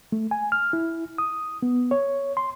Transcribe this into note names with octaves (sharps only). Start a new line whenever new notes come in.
A3
G#5
F6
E4
D#6
B3
C#5
C6